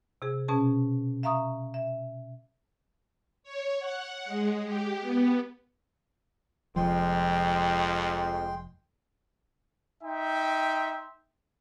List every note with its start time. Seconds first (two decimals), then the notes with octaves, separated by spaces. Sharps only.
0.22 C3 G#4
0.48 B2 C#4 G#4 A5
1.23 E5 F5 A#5 C#6 D#6
1.74 E5
3.43 C#5
3.79 F#5
4.25 G#3
4.64 G4
5.01 B3
6.76 F1 F2 F3 G#3 G5 C6
10.04 D#4 E5 G5 C6